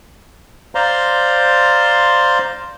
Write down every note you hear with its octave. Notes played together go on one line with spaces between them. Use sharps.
C5 D5 F5 A#5 C6